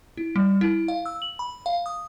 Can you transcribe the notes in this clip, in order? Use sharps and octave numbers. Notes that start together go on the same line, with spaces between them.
E4
G3
E4
F5
E6
F#7
B5
F5
D#6